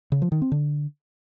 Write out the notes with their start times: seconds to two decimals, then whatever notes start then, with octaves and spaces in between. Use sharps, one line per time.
0.12 C#3
0.22 F3
0.32 D#3
0.42 C4
0.52 D3